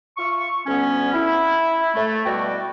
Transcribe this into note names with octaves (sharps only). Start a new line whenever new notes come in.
F4 E5 C#6
D2 G3 B3 C#4
E4
A3
B2 G3 F#4 D5 G5